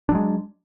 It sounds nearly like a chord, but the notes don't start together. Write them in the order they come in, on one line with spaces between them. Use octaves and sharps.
D4 F#3 G#3